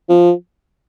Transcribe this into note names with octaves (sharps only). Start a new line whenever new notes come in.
F3